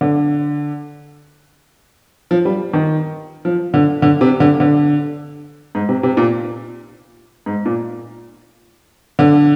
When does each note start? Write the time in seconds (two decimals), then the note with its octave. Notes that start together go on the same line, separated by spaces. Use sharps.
0.01 D3
2.31 F3
2.45 G3
2.74 D#3
3.45 F3
3.74 D3
4.02 D3
4.21 C3
4.40 D3
4.60 D3
5.75 G#2
5.89 C3
6.03 C3
6.17 A#2
7.46 G#2
7.65 A#2
9.19 D3